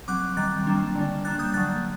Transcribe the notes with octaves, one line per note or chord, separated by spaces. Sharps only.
F#3 C4 D6 F#6
D#3 G3 C4 F#6 A6
G3 A#3 D4
D3 G3 D4
G3 A#3 D4 F#6 A6
D#6 G6
D3 F#3 A#3 F#6 A6